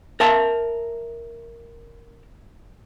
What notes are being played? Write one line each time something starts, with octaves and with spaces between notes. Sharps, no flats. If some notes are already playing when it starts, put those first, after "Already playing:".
A#4 E5 A5